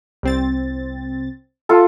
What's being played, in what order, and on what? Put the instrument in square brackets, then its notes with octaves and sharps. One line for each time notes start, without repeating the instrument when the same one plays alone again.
[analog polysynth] C2 C4 A6
[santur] F4 A4